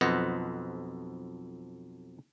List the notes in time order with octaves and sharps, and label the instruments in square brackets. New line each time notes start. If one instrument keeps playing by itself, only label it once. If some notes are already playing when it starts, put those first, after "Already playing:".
[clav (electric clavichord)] B1 F2 B4 C5 D#5 F#5